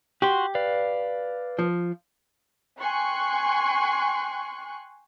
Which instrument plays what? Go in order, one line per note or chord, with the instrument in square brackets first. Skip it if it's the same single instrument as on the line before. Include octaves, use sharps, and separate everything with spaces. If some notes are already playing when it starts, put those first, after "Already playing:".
[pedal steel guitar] F#4 C6 [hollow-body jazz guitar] G4
[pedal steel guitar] B4 D5 F5
[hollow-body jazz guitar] F3
[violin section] G5 G#5 C6 C#6 F#6